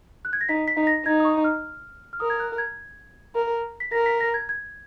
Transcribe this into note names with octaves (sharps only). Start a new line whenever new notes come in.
F#6
G#6
A#6
D#4 B6
B6
D#4
A#6
D#4 G#6
D#6
C#6
F6
F6
A#4 D#6
G#6
F#6
G#6
A#4
B6
A#4 A#6
B6
A#6
G#6
G#6